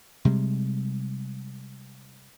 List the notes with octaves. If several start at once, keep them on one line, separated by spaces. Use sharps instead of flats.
C3 G3 G#3